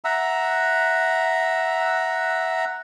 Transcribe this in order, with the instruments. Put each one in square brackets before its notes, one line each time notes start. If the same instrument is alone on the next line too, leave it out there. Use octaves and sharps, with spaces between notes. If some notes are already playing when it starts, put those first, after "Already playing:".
[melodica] E5 F#5 A#5 E6